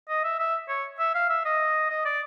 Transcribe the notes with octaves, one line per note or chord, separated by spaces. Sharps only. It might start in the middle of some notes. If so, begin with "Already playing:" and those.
D#5
E5
E5
C#5
E5
F5
E5
D#5
D#5
D5